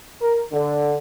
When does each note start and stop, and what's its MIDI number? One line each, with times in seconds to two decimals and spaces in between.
0.21 0.41 70
0.52 0.96 50